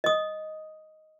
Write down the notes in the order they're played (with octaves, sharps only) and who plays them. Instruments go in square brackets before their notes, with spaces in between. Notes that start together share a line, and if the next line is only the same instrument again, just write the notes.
[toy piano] D#5 D#6